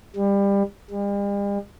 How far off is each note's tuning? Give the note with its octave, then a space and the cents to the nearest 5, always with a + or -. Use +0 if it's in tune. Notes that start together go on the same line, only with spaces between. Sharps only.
G3 +25
G3 +45